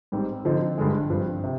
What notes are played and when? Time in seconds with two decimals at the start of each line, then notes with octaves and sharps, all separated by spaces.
0.12 G#2 G3 C4
0.45 D3 F3 C4 D#4
0.78 G2 D3 G#3
1.10 G2 F3 C4
1.44 C3